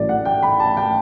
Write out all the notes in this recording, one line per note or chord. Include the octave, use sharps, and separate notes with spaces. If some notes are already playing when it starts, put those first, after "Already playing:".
Already playing: A1 A2 F#3 A3 D5
F#5
G5
B5
A5
G5